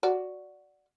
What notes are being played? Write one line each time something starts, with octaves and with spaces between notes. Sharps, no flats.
F#4 D5